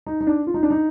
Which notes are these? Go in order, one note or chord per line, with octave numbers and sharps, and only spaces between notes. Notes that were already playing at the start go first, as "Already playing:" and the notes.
D#4
D#4
D4
F4
D#4
D4
D#4